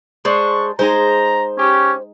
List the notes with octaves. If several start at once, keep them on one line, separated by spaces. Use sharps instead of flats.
G#3 D4 C5 C#6
G#3 D#4 G#4 C5 A#5
C#4 G4